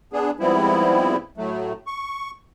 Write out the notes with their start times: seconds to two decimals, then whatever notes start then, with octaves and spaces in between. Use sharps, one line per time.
0.13 B3 D4 G#4
0.40 G#2 F3 G3 B3 C4 E4
1.37 A2 F#3 A3
1.87 C#6